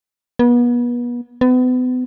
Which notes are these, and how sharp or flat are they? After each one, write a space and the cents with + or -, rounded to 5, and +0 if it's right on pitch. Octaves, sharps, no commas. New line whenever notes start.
B3 -35
B3 +35